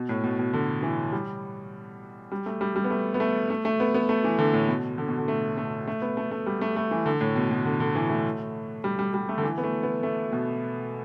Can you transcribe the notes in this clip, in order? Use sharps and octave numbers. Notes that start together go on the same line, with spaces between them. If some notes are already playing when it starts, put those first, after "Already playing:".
Already playing: B2
A2
B2
B2
D3
E3
G3
G3
A3
G3
G3
B3
A3
B3
A3
A3
A3
B3
B3
A3
E3
D3
A2
B2
D3
B2
D3
A3
A3
A3
B3
A3
A3
G3
A3
A3
E3
D3
A2
B2
B2
D3
D3
E3
A3
G3
G3
G3
A3
D3
E3
B3
A3
B3
A3
B2